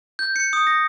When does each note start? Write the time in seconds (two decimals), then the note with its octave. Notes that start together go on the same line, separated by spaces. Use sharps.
0.19 G6
0.36 C#7
0.53 D#6
0.67 A#6